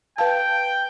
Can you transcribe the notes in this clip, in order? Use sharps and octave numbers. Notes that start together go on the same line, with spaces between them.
B4 F5 G5 A5